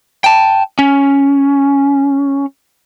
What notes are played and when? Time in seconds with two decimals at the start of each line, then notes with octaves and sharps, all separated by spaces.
0.24 G5 A5
0.79 C#4